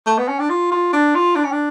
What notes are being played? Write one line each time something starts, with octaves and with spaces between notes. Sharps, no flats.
A3
B3
C#4
D4
F4
F4
D4
F4
D4
C#4
D4